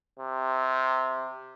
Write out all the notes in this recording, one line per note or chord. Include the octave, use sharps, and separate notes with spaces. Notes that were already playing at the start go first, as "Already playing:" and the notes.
C3